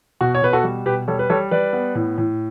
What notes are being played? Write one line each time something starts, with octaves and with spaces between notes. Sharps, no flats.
B2 F#4
C#5
B2 B4
F#4 A4
G3
B2 G4 B4
G3 A4 C#5
B4
G3 A4 C#5
G3 B4 D5
B3
A2
A2